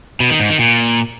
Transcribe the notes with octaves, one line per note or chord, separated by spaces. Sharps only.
B2
D#3
G#2
D#3
A#2